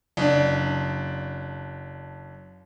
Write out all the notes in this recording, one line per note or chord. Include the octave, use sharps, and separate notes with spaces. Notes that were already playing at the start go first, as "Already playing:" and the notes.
F#1 D4